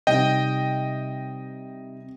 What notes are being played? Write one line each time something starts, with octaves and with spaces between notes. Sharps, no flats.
C3 G3 C4 D#4 D#5 G5